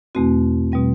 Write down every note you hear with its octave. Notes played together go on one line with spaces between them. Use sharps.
E2 B2 A3 C4 F#4
B2 G3 C4